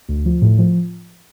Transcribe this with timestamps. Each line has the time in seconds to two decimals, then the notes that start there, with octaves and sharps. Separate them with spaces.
0.09 D2
0.26 F3
0.42 A2
0.58 F3